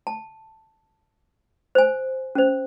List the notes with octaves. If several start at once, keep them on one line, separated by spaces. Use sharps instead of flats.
A5
C5 G#5
C#4 C5